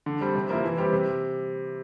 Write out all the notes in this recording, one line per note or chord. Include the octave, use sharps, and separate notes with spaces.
D3
G3 C4
C3
F3 A#3 E4
E3
G3 C4 G4
C3